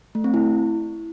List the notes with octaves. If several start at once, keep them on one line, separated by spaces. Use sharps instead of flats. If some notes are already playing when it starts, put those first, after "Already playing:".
A3
C4
E4